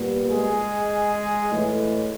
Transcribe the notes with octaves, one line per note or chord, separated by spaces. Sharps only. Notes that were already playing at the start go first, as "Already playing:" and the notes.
Already playing: A#2 G3 B3
G#3 G#4
A2 E3 G#3